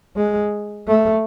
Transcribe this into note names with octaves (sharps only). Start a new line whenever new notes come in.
G#3
A3